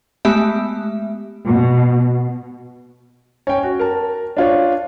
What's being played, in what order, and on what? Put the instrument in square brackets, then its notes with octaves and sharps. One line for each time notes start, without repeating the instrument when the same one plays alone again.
[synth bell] G#3 A3 B3 G4 E5
[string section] B2
[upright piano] C#4 G5
F#4
A#4 A5
D4 F4 C#5